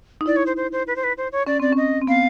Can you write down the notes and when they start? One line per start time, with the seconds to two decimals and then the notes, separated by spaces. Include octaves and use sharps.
0.21 D#4
0.26 E4 D5
0.36 C#5
0.46 C5
0.56 C5
0.72 C5
0.87 B4
0.96 C5
1.04 B4
1.17 C5
1.32 C#5
1.47 C#4 D5
1.60 C4 D5
1.72 C#4 D#5
2.02 C4
2.07 B3 F5